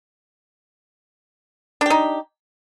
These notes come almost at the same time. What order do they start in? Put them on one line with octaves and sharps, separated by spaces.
D4 G4 D#4